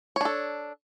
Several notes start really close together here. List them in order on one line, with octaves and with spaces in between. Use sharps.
C#5 D4 A4